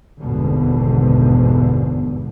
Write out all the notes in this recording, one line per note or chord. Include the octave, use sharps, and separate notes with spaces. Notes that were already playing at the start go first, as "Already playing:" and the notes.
G#1 E2 G2 B2 D3